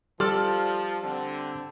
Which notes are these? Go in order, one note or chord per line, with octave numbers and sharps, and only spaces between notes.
F3 G3 A4 D5 C6 F6
D3 C4